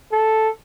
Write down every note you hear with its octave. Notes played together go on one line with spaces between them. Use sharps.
A4